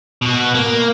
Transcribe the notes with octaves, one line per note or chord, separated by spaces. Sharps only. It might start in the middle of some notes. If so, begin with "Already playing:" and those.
B2 F#4
A#3